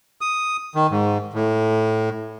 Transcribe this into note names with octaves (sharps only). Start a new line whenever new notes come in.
D#6
D#3
G#2
A2